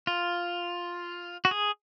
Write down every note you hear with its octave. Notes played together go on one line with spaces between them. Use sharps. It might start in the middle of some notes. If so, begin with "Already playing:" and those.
F4
F#4
G#4